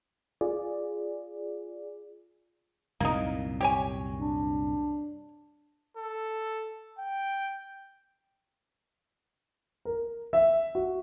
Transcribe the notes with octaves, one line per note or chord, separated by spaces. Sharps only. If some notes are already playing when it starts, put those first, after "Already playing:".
F4 G#4 D5
C2 F#2 A#2 A#3 D#4
G4 C#5 G#5
D4
A4
G5
A#4
E5
F#4